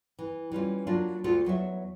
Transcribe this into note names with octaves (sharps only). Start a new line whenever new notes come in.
E3
E3 G3 C#4 F4
F#3 A#3 D4 F4
D2 F4 F#4 A4
E2 F#3 C#5 E5